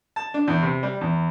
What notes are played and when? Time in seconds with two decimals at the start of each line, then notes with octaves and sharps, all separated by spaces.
0.16 A5
0.34 D4
0.48 E2
0.62 C3
0.83 G3
1.01 E2